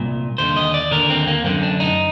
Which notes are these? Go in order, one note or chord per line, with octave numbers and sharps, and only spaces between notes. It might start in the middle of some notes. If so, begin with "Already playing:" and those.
Already playing: C2 A#2
D#2 D3 C5
D#5
D5
D#2 D3 A#4
C4
A#3
F#2 D3 C4
D4
D#4